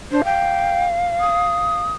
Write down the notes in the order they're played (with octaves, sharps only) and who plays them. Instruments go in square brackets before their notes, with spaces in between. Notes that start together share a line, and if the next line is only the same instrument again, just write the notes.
[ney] D4 [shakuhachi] C5
[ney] F5 [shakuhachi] G5
[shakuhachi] D#6